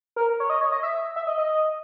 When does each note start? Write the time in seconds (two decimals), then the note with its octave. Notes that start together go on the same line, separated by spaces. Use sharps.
0.16 A#4
0.40 C#5
0.50 D#5
0.61 C#5
0.72 D#5
0.83 E5
1.16 E5
1.27 D#5
1.38 D#5